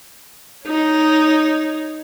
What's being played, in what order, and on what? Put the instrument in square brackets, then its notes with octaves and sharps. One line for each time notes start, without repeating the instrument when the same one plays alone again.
[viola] D#4 C#5